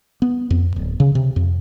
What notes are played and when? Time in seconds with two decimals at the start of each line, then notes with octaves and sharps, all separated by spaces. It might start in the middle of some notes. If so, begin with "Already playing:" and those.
0.22 B3
0.50 F2
0.76 D1
1.00 C#3
1.15 C3
1.36 F2